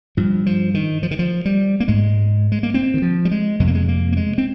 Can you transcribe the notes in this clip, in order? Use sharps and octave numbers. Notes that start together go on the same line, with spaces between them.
G2 F3
F3
D#3
F3
D#3
F3
G3
A#3
G#2 G#3
G#3
A#3
C4
D#3
F3
G3
G#3
F2 C3 G#3
A#3
G#3
A#3
A#3
G#3
C4